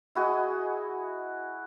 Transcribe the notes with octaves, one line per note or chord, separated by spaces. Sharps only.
E4 F#4 G#4 D#5